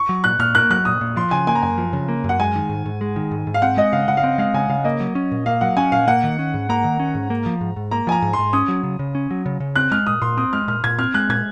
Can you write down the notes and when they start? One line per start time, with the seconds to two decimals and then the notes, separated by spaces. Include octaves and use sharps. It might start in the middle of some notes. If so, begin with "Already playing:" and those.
Already playing: C#6
0.09 F#3
0.24 A#2 F#6
0.39 A#2 F6
0.55 A#3 F#6
0.70 F#3 F#6
0.85 A#2 D#6
1.01 A#2
1.16 F3 C6
1.31 C#3 G#5
1.47 A#3 G#5
1.55 A#5
1.63 F#2 G#5
1.78 F3
1.93 C#3
2.09 A#3
2.24 F#2
2.29 F#5
2.40 G#3 G#5
2.55 D#3
2.69 G#2
2.86 G#2
3.01 G#3
3.16 D#3
3.31 G#2
3.47 G#2
3.54 F5
3.62 C4 F#5
3.77 G#3 D#5
3.93 C#3 F5
4.08 C#3 F#5
4.17 F5
4.23 C4 F#5
4.38 G#3 F5
4.54 C#3 G#5
4.69 C#3 F5
4.84 A#3 D#5
5.00 F#3
5.15 C#4
5.32 A#2
5.46 A#3 F5
5.61 F#3 F#5
5.77 C#4 G#5
5.92 A#2 F5
6.07 A#3 F#5
6.24 D#3
6.39 C#4
6.54 G#2
6.69 A#3 A#5
6.84 D#3
7.00 C#4
7.15 G#2
7.30 A#3
7.46 F3
7.61 G#2
7.76 G#2
7.91 A#3 A#5
8.07 F3 G#5
8.12 A#5
8.22 G#2
8.33 C6
8.38 G#2
8.53 C#4 D#6
8.68 F#3
8.83 C#3
8.99 C#3
9.15 C#4
9.31 F#3
9.46 C#3
9.60 C#3
9.76 C4 F#6
9.91 G#3 F6
10.07 A#2 D#6
10.22 A#2 C6
10.37 C4 D#6
10.53 G#3 F6
10.68 A#2 F6
10.84 A#2 G#6
10.98 C4 F6
11.14 G#3 F#6
11.29 A#2 G#6